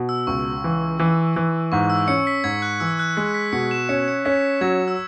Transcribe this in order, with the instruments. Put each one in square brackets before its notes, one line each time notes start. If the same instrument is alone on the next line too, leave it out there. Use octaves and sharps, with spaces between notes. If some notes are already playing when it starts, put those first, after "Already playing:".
Already playing: [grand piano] B2
[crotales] E6
[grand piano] C#2 [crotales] C#6
[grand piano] E3
E3
E3
[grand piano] G#2 [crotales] C#6
[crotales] E6
[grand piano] C#4 [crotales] C#7
[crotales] B6
[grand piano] G#2 [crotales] G#6
[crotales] F#6
[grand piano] E3 [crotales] E6
[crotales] F#6
[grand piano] G#3 [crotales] B6
[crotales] B6
[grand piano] B2 [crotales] C#7
[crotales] E7
[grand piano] C#4 [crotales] C#7
[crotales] C#7
[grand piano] C#4 [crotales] B6
[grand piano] F#3 [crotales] G#6
[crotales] E6